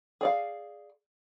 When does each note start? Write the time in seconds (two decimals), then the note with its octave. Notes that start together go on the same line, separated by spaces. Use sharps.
0.21 G#4 D5 F5